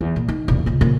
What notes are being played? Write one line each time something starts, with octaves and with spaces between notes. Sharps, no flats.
E2
A#2
D#3
E1 A#1
C#2 B2
A#2 C#3